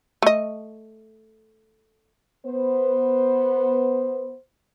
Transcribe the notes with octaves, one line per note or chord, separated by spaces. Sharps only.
A3 D#5
B3 C5